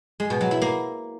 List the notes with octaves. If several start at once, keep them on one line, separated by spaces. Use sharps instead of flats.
G#3
B2
F#3
E4
A#3